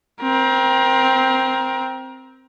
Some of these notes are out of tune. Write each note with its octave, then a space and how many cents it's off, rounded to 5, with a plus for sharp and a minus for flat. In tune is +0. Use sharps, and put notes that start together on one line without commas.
C4 +0 A#4 +30